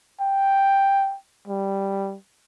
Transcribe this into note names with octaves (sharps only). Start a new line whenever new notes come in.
G5
G3